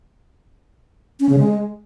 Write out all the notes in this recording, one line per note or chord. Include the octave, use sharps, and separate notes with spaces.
C#4
C#3
G#3